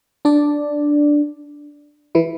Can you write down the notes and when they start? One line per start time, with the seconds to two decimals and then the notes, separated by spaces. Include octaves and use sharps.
0.25 D4 D5
2.15 E3 E4